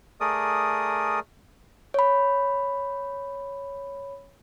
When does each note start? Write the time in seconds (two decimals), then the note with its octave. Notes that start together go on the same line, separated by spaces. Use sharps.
0.21 A3 G#4 A#4 D5 D#6
1.94 C#5 B5